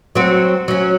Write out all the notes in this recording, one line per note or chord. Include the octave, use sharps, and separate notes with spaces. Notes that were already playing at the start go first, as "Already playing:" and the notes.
F#3 C4
F#3 C#4